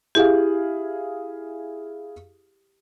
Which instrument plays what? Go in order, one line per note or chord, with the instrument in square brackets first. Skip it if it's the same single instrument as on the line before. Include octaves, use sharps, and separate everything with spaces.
[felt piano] E4 G#4 F5 [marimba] G4